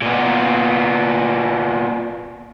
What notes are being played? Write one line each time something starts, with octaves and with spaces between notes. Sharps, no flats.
A#2 B3